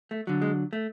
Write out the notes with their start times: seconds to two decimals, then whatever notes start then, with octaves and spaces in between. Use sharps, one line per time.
0.11 A3
0.27 D3 F#3
0.42 G#3
0.73 A3